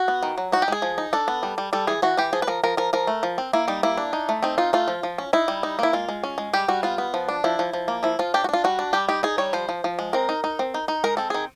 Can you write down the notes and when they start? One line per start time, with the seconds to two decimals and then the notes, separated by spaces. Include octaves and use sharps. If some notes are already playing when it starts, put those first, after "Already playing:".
Already playing: F#4
0.08 B3
0.23 D#3
0.38 F#3
0.52 D#4 F#4
0.62 G4
0.68 G#3 G#4
0.82 F3
0.98 D#4
1.13 D4 A4
1.28 B3
1.43 G3
1.58 G3
1.73 G3 A4
1.87 E3 G#4
2.02 E3 F#4
2.17 E3 G4
2.33 F3 G#4
2.42 B4
2.47 F3 A#4
2.63 F3 A#4
2.77 F3 A#4
2.93 F3 A#4
3.07 A3
3.23 F3
3.38 C4
3.53 A#3 E4
3.68 G3 D#4
3.83 A#3 E4
3.97 D4
4.13 D#4
4.29 A3
4.43 C4 D#4
4.58 D#4 F4
4.73 A3 F4
4.88 F3
5.03 F3
5.18 C#4
5.33 D#4 E4
5.48 G3
5.63 D#4
5.79 A#3 E4
5.93 G#3 F4
6.09 G#3
6.23 C#4
6.38 G#3
6.53 G3 G4
6.68 G3 F#4
6.83 B3 F4
6.98 B3
7.14 F3
7.29 D4
7.44 F3 E4
7.59 F3
7.73 F3
7.88 A#3
8.03 F3 E4
8.19 F3 F4
8.34 D4 G4
8.44 F#4
8.49 D4 F4
8.64 G3 F#4
8.79 D4
8.93 G3 G4
9.09 D#4 G4
9.23 D#4 G#4
9.38 G3 C#5
9.53 F3 C5
9.69 F3
9.84 F3
9.99 G#3
10.13 C4 A#4
10.29 D#4
10.44 D#4
10.59 C4
10.74 D#4
10.88 D#4
11.04 G#3 A#4
11.17 C4 A4
11.30 D#3 G#4